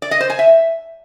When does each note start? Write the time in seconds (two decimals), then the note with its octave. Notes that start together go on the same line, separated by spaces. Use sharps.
0.02 D5
0.11 D#5
0.20 C5
0.30 G#5
0.39 E5